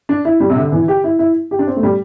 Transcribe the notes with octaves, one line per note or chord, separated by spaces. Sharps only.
D4
E4
G3
C3
D3
E3
G4
E4
E4
G4
D4
C4
A3
G3